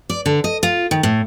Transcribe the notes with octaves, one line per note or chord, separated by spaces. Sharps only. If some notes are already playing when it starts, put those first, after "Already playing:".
D5
D3
D#5
F4
D#3
A2